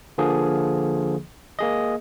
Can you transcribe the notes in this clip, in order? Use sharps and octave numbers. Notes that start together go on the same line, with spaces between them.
D3 F3 A#3 G#4
A#3 G#4 D#5